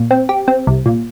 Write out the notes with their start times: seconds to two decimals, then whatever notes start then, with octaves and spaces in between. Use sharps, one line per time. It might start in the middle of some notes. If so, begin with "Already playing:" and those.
Already playing: A#2
0.11 C4
0.29 G4
0.48 C4
0.67 C2
0.86 A#2